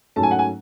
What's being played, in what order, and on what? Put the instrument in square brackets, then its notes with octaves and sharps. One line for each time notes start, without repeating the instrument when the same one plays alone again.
[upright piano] G#2 F#3 A3 C#4 A5
G#5
F#5
G#5